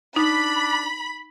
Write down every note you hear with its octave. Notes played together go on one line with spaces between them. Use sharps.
D4 D#4 B5